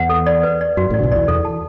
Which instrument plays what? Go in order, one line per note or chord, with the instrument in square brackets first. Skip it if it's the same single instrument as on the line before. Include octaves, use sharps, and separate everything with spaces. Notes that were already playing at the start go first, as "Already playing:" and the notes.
Already playing: [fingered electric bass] E2 [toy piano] F#5
[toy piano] A4
D5
B4
D5
[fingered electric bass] F#2 [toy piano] F#4
[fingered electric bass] A1 A2 [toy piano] D5
[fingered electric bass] D3
B1 B2
[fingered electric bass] E2 E3 [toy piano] D5
[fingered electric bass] E2 [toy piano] A4
[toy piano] A5